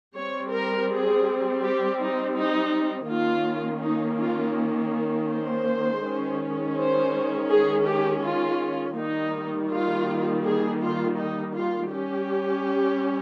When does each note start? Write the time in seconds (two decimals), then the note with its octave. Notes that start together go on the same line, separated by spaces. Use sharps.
0.16 G3 C4 C#5
0.52 A#4
0.90 G#4
1.63 G4
2.00 D#4
2.36 D#4
3.09 D#3 A#3 C#4 F4
3.83 D#4
4.20 F4
5.30 C5
6.03 D#3 G#3 C#4
6.77 C5
7.50 G#4
7.87 G4
8.23 F4
8.97 D#3 G3 A#3 D#4
9.71 F4
10.45 G#4
10.81 F4
11.18 D#4
11.55 F4
11.91 G3 C#4 G4